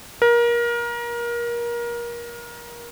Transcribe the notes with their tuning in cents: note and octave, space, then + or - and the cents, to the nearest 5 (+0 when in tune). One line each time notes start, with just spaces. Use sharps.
A#4 +25